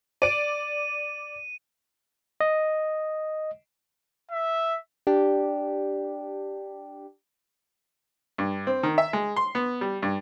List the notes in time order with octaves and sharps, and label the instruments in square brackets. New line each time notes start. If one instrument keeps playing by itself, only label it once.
[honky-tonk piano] D5 D7 [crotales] D#7
[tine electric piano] D#5
[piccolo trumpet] E5
[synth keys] D4 G4
[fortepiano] G2
C4
D#3
E5
G#3
C6
B3
G3
G2